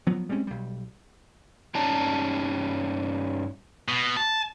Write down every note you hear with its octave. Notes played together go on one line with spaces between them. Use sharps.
F3 F#3 B3
G3 G#3 C4 C#4
B1 G3
G2 C#4 D#4 D5 A5 A#5
B2
A5